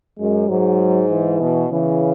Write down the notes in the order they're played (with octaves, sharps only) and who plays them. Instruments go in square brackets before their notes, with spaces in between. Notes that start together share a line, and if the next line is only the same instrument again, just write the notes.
[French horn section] F#2 [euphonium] G#3
[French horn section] G#2 [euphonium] F#3
[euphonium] E3
[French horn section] B2
[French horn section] C#3 [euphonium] E3